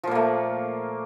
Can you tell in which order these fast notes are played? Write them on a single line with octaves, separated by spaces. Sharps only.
F3 A#2 A#3 A3